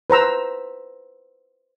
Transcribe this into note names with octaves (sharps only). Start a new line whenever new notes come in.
B4 C5 A#5 E6